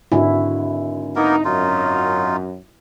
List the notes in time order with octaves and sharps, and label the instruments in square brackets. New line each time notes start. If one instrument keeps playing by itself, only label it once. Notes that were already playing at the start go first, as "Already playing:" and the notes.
[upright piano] G#1 D3 G#5 [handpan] E4 F#4
[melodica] A#3 B3 A#4 [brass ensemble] D#4
[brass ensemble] F#2 [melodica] D#4 F4